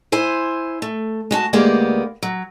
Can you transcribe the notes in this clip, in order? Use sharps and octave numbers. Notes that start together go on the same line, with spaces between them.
E4 C5 G#5
A3
G#3 F#4 A5
D2 G#3 A#3 B3 G4 D5
F#3